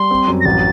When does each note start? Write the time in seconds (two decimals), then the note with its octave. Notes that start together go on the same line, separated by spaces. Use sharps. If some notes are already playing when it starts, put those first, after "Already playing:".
Already playing: G3 C6
0.11 C4
0.28 F#2
0.41 A#6
0.45 A1 A6